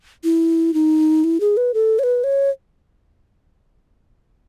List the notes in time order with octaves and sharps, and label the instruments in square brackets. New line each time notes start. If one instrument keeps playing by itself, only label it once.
[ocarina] E4
D#4
E4
G#4
B4
A4
C#5
B4
C#5